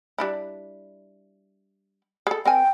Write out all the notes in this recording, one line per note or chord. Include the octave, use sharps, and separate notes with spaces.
G3 D4 E4
G#4 A4
C4 A#4 G5 G#5